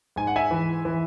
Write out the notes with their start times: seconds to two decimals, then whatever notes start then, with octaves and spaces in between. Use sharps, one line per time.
0.16 G#2 G#5
0.27 F#5
0.36 E5 G#5
0.51 E3
0.85 E3